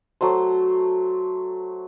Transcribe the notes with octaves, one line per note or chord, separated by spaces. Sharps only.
F#3 A3 C5